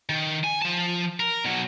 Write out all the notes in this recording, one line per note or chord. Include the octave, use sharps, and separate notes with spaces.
D#3
G#5
F3 A5
A#4
B2 F#3